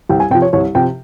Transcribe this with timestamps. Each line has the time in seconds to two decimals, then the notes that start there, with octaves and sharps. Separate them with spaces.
0.09 C2 G5
0.20 G#5
0.30 C3 G5
0.35 F3
0.42 C#5
0.53 C2 C#5
0.75 C3 F3 G5